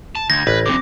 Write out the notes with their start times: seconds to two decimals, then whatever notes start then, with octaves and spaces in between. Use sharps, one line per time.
0.15 A5
0.30 D2 G6 G#6 A#6
0.47 A1 B4
0.66 F#2 D3 C4 D6